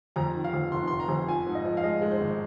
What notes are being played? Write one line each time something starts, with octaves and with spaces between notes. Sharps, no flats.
F2 A#5
D#3
F5
F2
F1 C6
F1 C6
A#5
F2
F3 G#5
G#2
D#5
F3
F5
G#3 D#5
G#3
C5
G#1